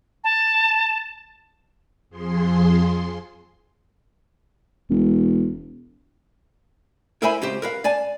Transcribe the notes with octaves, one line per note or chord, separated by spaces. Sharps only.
A5
F2 F3 G#4 C6
E1
E4 A#4 C5 E5 G#5 B5
C#2 C4 G4 C5
A#4 B4 F5
D5 G#5 A5